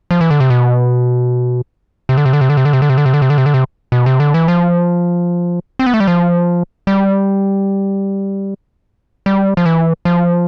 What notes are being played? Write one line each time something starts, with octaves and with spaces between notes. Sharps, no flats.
F3
E3
D3
C3
B2
C3
D3
C3
D3
C3
D3
C3
D3
C3
D3
C3
D3
C3
D3
C3
D3
C3
D3
C3
B2
C3
D3
E3
F3
C4
B3
A3
G3
F3
G3
G3
F3
E3
F3